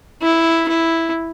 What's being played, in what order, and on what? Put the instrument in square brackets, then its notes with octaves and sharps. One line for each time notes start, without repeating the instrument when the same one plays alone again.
[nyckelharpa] E4
E4